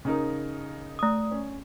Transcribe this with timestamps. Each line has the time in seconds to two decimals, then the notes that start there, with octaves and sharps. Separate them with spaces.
0.05 C#3 D#4 A#4
0.99 A3 D#6
1.31 C#4